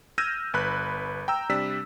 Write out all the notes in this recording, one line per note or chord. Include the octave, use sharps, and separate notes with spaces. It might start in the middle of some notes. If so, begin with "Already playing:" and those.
E6 F6 G6 G#6 A#6 D#7
G1 B4 B5 F#6
G5 A#5 E6
C3 G3 D4 E6 B6